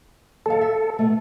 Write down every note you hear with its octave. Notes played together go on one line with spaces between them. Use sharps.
D#2 F#3 A4 F5
E5
B2 A3